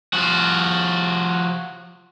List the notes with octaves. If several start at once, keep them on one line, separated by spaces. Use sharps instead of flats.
F3 F#4